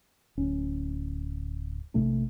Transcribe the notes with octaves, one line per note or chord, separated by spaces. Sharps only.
D1 C#4
A#1 C3 A3 D4